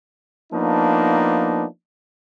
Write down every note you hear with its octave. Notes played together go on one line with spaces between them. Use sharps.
F3 A#3 B3 D4 D#4